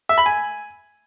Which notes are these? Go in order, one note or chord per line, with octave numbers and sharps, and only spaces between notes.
E5
B5
G#5